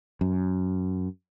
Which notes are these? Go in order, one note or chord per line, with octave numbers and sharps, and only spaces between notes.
F#2